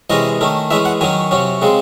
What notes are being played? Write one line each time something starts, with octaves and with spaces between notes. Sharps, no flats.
C3 E3 G#3 C#4 D#5
D#3 A3 C#4
E3 G#3 C#4 E5
F#5
D#3 F#3 C#4 G#5
C3 F#3 C#4
C#3 G#3 C4